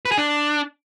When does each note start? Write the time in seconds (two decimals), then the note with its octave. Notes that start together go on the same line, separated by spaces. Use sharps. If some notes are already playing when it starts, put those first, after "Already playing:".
0.05 B4
0.12 G#4
0.18 D4